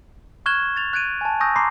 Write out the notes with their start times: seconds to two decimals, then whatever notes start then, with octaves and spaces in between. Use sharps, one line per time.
0.46 C#6 F6 F#6 G#6 E7 G7
0.76 A6 F7
0.93 F#6 G#6 D7 D#7
1.21 G#5 A5
1.40 G#5 C#6 D#6 E6 G6 A#6
1.56 A#5 C6 D6 C7